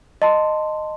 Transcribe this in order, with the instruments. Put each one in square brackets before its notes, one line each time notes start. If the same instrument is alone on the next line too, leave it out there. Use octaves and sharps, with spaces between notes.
[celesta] D#5 A5 C6